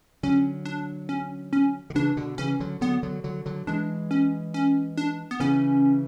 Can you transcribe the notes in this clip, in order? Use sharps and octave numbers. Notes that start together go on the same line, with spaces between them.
D3 F#3 C#4
D4
C#4
C#4
D3
C#3 E3 D4
B2 D3
C#3 E3 C#4
D3 F#3
D3 F#3 B3
D3 F#3
D3 F#3
D3 F#3
E3 G#3 D4
C#4
C#4
D4
B3
C#3 E3 C#4